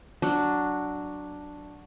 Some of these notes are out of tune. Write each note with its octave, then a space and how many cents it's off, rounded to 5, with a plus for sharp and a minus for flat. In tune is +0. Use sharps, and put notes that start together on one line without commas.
F#3 +0 D4 +0